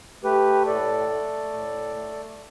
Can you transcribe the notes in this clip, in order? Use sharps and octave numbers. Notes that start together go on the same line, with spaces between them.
A3 G4 B4
A2 A4 D5
A3
A2
A3